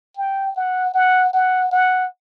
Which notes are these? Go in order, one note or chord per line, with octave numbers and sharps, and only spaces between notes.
G5
F#5
F#5
F#5
F#5